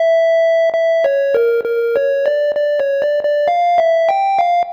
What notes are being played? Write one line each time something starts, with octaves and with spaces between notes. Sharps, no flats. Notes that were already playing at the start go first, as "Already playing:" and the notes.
Already playing: E5
E5
C#5
A#4
A#4
C#5
D5
D5
C#5
D5
D5
F5
E5
G5
F5